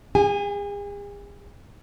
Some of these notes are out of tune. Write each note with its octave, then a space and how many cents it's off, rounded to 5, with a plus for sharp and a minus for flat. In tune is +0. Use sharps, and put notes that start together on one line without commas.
G#4 -40 G#5 +0